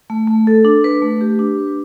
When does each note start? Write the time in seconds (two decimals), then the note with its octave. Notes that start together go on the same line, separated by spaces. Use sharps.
0.10 A3
0.28 A3
0.47 A4
0.65 D4
0.84 B4
1.02 A3
1.21 G4
1.39 D4
1.59 B4